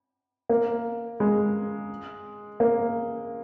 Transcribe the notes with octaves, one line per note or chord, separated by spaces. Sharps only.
A#3
G#3
A#3